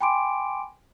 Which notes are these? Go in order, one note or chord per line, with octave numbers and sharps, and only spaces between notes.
G5 G#5 B5 C6 D6 D7